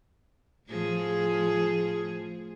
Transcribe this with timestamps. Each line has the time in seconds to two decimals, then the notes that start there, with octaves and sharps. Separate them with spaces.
0.68 A2 F3 G#4